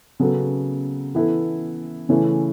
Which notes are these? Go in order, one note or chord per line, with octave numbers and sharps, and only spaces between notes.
C#3 F#3 B3 A4
E3 B3 E4 A4
C#3 E3 A3 C#4 E4